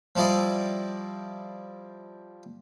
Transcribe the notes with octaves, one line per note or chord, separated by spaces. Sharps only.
F3 G3 E4 D5 D#5